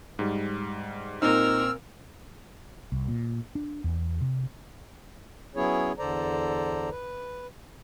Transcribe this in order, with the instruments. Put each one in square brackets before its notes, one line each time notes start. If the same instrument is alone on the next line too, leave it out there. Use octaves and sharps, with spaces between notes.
[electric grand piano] G#2 G3
[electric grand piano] A#2 C4 [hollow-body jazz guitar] D#4 [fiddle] A#4 [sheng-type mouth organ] E6 F6
[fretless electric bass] C2
A#2
D4
E2
C3
[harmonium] F#3 B3 C#4 E4 G#4 C#5
E2 D3 A4 C5 D5 A#5
B4